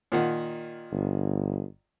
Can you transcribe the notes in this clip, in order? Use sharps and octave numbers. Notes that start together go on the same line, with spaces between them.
A#2 D#3 F#5
G1